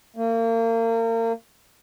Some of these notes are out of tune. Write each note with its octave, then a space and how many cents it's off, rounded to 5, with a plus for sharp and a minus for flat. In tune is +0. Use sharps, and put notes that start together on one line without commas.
A#3 -35